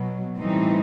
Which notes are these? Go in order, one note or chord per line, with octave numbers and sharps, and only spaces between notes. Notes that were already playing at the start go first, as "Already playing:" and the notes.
Already playing: B2 F#3
A2 E3 G3 C4 D#4